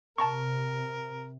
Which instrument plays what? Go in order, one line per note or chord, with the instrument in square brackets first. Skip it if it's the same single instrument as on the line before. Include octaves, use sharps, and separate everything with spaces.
[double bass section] C3 [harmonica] A#4 [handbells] A5 A#5 C#6